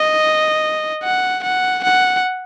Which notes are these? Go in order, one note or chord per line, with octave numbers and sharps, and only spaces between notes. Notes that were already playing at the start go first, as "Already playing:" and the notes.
Already playing: D#5
F#5
F#5
F#5